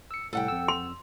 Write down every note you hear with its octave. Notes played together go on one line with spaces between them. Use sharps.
E6 C#7
C2 A2 A4 F#5 G5
F2 E6
C6